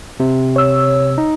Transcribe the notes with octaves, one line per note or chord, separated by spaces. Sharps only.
C3
C#5 E6
D#4